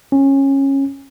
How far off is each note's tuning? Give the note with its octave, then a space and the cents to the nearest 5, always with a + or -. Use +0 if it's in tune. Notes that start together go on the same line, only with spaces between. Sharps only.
C#4 -20